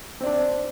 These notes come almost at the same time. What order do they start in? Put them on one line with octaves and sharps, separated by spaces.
C4 D5 D4